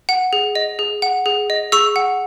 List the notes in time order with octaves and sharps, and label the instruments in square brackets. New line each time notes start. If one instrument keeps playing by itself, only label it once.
[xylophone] F#5
G#4
D#5
G#4
F#5
G#4
D#5
G#4 C#6 E6
F#5